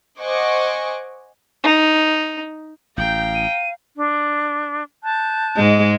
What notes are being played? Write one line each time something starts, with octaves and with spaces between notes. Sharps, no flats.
C5 D#5 F#5 G#5 C#6 D6
D#4
A1 F5 G5 A#5 G6
D#7
D4
A5 F#6 G6
G#2 G#3